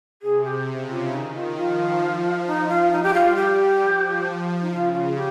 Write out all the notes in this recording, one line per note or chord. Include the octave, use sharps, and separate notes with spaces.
C3 G#4
G4
C#3
F4
D#3 D#4
F4
F3 F4
F3
D#4
F4
G3 D#4
G4
F4
G4
F3
D#4
C#3 F4
F4
G4